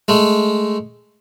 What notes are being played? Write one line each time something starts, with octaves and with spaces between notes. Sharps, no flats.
G#3 A3